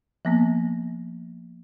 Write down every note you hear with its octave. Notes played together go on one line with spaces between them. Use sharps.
F3 A#3 B3